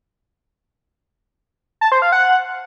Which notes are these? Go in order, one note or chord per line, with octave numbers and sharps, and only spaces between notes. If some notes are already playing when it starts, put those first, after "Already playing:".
A5
C5
F5
F#5